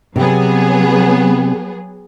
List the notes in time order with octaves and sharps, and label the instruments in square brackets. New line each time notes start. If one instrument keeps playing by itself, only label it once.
[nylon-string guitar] C3 [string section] F#3 B3 G#4